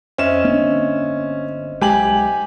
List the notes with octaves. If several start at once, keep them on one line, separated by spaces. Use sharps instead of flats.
F2 C#4 C5 D#5 E5 E7
G1 A#3 C4 D4
B1 G#3 G4 G#5 F#7